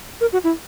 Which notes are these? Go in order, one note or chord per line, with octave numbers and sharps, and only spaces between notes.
A#4
F#4
E4